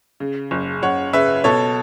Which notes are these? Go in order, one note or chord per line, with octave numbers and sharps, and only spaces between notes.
C#3
F#1
F#1 C#5 F#5
C#3 B4 E5
B2 A4 C#5